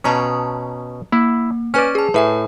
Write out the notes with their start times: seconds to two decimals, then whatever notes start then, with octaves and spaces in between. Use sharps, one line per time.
0.04 B2 C#4 A5 A#5 D#6
1.12 A#3 E4
1.74 C#4 B4 D5 G#5 F6
1.95 G#4 A5
2.14 A2 B4 E5 G#5